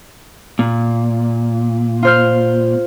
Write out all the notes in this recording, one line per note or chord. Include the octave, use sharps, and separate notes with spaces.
A#2
F4 C5 F6